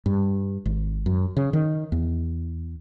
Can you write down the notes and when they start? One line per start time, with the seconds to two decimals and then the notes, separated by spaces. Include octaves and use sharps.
0.06 G2
0.65 G#1
1.06 F#2
1.37 C#3
1.53 D#3
1.92 E2